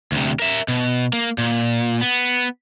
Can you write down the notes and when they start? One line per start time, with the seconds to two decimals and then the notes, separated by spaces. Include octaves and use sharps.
0.12 D2 C3
0.40 A#4 E5
0.68 B2
1.13 A#3
1.38 A#2
2.01 B3